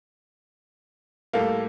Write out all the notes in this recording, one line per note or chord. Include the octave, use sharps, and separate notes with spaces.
A2 G3 A#3 A4 F5